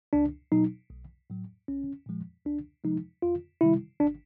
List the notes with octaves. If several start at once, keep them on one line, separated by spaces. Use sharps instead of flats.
C#2 D4
B2 F#3 D#4
B1
A2 F#3
A#1 C#4
A#2 F3 G#3
C#2 D4
C3 F3 G#3 D#4
F2 F4
C3 D#3 G3 E4
G#1 D4